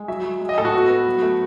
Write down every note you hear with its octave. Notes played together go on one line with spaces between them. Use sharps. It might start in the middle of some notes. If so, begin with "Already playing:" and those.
Already playing: G#3
F#3 E5
F#3
G#3
D#5
A2 A4
F#4
B3
B3
F#3
A3